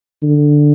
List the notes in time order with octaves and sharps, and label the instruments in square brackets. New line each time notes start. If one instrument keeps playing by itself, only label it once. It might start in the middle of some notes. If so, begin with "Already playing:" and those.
[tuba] D3